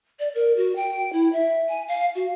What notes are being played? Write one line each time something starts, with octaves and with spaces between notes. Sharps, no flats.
D5
A#4
F#4
G5
E4
E5
G#5
F5
F#4